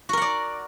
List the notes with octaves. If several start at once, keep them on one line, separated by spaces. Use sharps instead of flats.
F#4 A#4 D5 F#5